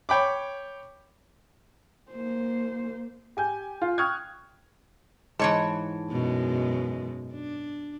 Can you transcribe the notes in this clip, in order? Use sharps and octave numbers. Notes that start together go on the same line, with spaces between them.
C#5 G5 B5 D6
A#3 C5
G4 G#5 G6
F4
G5 C#6 D#6 F6 F#6 G#6
G#2 E3 C#5 A5
F#2 B2 G#3
D4